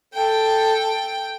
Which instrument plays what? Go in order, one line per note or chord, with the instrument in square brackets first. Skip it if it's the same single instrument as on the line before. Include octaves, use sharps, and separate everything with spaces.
[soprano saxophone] A4 [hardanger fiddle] G5